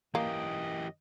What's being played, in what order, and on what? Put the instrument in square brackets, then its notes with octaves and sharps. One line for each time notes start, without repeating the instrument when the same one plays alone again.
[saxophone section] F#2 D#5 [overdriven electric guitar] E3 G4 [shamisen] A#3